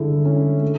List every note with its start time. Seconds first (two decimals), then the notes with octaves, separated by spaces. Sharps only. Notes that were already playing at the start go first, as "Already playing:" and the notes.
Already playing: D3 G#3 E4
0.25 C#4
0.62 A3